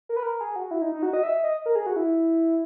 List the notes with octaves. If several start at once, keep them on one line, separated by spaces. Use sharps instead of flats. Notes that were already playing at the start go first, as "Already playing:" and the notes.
A#4
B4
A#4
G#4
F#4
E4
D#4
D#4
F#4
D#5
E5
D#5
A#4
G#4
F#4
E4